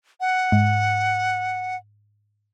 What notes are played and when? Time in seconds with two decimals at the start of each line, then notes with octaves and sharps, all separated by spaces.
0.21 F#5
0.52 G#2